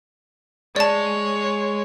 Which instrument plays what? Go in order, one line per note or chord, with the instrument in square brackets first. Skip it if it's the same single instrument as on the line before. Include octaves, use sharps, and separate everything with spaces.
[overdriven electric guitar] G#3 [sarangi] C#5 [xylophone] D5 A5